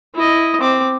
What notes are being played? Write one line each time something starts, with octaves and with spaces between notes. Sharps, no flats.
E4 D#5
C4 D6